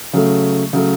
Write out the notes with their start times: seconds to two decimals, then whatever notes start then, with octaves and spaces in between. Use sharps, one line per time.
0.13 C#3 F#3 A3
0.73 C#3 F#3 A3